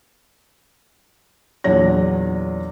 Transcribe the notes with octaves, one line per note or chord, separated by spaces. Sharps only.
E2 A#2 F#3 D4 C#5 A#6